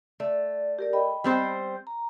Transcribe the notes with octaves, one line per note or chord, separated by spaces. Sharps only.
A3 D5
G4 A#4 D5
D#5 G5 B5
G3 C4 C5
A#5